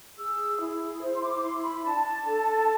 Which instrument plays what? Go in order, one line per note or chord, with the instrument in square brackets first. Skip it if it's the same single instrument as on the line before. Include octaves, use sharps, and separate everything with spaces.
[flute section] G#4 E6
E4
C5
C6
D6
E4 C6
B5
D4 A5
A4